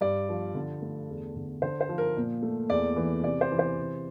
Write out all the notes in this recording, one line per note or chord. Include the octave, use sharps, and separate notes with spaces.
G2 D5
F3
D3
A3
E2
D3
D3 C5
C5
F3
A#4
A#2
A3
E2 D5
E3
C3 D5
C5
E3
C5
C3